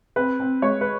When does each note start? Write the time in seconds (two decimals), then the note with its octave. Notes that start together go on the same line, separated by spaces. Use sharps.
0.16 C4 B4
0.40 C4
0.62 G#3 C#5
0.81 B4